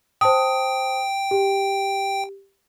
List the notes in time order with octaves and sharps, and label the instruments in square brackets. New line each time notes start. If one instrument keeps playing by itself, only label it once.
[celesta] C5 A5 D#6 [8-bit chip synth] G5
[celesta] G4